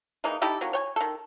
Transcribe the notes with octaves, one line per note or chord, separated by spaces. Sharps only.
E3 G#3 A#3 D#4
D#4 E4 G4 A4
F#3 A#3 C#4
C#5 G5 G#5
D#3 A4